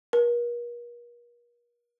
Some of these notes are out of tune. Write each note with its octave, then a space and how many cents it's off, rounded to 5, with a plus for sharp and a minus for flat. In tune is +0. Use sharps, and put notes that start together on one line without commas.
A#4 +40